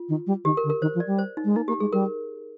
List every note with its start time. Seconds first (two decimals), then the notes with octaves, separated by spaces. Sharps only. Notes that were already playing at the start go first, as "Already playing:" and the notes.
Already playing: F4
0.09 D#3
0.27 G3
0.44 D#3 G4
0.57 A#4
0.64 D3
0.70 A#4
0.81 D#3 C5
0.95 F3
1.00 D5
1.07 G3
1.18 C5
1.37 D#4
1.44 G#3
1.56 A#3 D#4
1.68 A#3 G4
1.80 G#3 G#4
1.93 G3 A#4